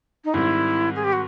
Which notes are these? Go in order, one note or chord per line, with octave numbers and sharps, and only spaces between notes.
D#4
G#2 D#3 G3 C4 E4
G#4
G4
F#4